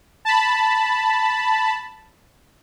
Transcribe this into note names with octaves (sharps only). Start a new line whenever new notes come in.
A5 B5